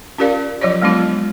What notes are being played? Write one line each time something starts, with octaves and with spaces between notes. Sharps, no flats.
C#4 F4 G4 A#4 D5 F5
F3 F#3 F4 C#5 D5
F#3 G#3 B3 D4 F4